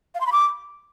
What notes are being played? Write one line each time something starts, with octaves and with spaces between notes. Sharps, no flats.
F5
C6
B5
D6